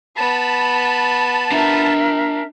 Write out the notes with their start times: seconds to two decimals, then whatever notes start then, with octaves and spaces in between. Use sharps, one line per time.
0.17 B3 A5 B5
1.52 D4 A#4 E5 A#5